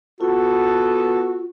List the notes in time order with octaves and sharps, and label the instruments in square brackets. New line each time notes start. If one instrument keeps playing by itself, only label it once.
[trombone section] B3 A4 [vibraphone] F4 [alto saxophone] F#4